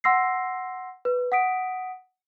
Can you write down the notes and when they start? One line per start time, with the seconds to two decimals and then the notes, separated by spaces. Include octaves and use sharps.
0.04 F#5 C6 E6 A#6 C7
1.05 B4
1.32 F#5 D#6 B6 D7